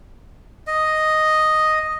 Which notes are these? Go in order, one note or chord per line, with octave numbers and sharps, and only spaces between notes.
D#5